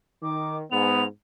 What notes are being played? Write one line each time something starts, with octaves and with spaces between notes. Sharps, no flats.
D#3 D6
G#2 B3 F7